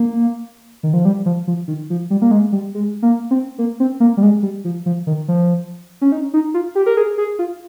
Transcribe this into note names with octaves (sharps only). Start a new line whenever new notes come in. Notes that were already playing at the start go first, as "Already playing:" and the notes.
Already playing: A#3
D#3
F3
G3
F3
F3
D#3
F3
G3
A#3
G#3
G3
G#3
A#3
C4
A#3
C4
A#3
G3
G#3
G3
F3
F3
D#3
F3
C#4
D#4
D#4
F4
G4
A#4
G#4
G#4
F4